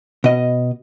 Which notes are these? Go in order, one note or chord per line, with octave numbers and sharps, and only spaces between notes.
B2 D#5